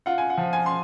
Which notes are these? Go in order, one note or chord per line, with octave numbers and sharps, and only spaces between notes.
F4 F#5
G#5
F#5
F3
G#5
C6